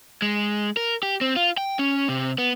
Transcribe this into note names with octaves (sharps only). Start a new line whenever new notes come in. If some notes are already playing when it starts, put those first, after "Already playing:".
G#3
A#4
G4
C4
F4
G5
C#4
C3
B3